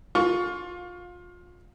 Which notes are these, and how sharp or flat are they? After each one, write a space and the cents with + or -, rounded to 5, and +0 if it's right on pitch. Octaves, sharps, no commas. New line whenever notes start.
F4 +25 F5 +35 C#6 +20